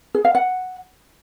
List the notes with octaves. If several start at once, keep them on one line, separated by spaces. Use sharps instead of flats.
G#4
F5
F#5